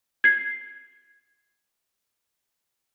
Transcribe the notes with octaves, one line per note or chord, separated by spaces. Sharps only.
G#6 C7